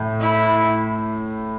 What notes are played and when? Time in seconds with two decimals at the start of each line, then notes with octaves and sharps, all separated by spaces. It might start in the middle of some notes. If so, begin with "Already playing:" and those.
Already playing: A2
0.21 E4